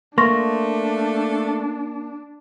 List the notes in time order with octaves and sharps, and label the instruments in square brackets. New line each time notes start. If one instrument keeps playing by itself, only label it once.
[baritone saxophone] A3 [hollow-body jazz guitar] A#3 [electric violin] D4 [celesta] C6 C#6 A#6